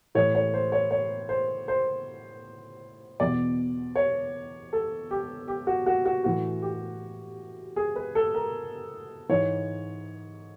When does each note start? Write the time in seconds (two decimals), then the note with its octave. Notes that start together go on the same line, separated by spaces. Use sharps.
0.15 A2 E3 C#5
0.35 C#5
0.54 C5
0.72 C#5
0.91 C#5
1.29 C5
1.68 C5
3.20 E2 B2 D5
3.96 C#5
4.73 A4
5.11 G4
5.48 G4
5.67 F#4
5.86 F#4
6.05 F#4
6.24 A2 E3 F#4
6.62 G4
7.76 G#4
7.96 B4
8.15 A4
8.35 A#4
9.29 G#2 E3 C#5